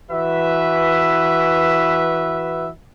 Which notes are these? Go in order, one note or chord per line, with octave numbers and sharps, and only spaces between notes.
E3 F#4 B4 E5